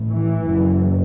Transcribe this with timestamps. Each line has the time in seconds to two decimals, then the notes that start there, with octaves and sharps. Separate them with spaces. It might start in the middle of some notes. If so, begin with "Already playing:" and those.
Already playing: A1 A2
0.10 E3
0.46 F#1 F#2